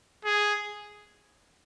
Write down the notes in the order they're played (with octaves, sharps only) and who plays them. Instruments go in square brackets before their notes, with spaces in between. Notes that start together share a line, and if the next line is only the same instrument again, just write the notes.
[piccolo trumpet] G#4